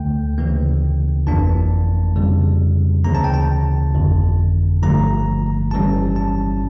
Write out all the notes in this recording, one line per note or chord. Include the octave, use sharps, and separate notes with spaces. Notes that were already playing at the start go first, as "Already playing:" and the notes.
Already playing: D2 D3 A3 G5
D2 C#3 E3 A#3
G1 F2 E3 A#3 D4 A5
F2 C#3 G3
D2 C#3 E3 A#3 A#5
A5
G5
A5
G1 F2 D3
G1 G2 D3 F3 A3 A#5
G1 G2 E3 G3 C#4 A5
A5